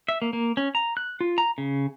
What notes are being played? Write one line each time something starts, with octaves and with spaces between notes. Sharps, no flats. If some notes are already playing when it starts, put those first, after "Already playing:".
E5
A#3
A#3
C#4
A#5
F#6
F4
A#5
C#3